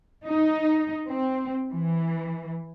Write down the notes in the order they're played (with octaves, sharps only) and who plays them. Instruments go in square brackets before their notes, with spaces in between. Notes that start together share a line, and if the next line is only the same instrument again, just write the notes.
[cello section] D#4
C4
E3